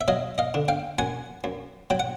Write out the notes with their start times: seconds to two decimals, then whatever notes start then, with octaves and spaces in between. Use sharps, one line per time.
0.01 E5
0.08 F#3 D#5 F5
0.38 D#5 F5
0.54 D3
0.68 F5 G5
0.99 F#2 F#5 G#5
1.44 F#2
1.90 F#3 G5
2.00 F#5